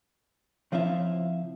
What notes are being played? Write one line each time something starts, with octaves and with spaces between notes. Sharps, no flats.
C#3 F3 C4 E4 E5 F5